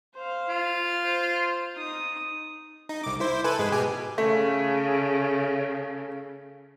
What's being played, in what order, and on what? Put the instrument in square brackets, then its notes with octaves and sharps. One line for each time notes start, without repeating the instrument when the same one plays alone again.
[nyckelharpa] C5 F5
[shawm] F4
[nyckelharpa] C5
D#4 D#6
[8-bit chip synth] D#4
C2 D6
E4 C5
A4 B4 G#5
G#2 G#3 B4
B2 G4 G#5
[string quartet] C#3 [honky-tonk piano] A3